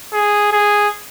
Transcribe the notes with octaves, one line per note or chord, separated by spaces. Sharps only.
G#4
G#4